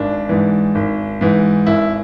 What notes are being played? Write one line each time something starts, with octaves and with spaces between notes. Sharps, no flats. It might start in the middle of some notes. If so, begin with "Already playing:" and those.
Already playing: G#1 D4
G#2 E3
G#1
G#2 E3
G#1 E4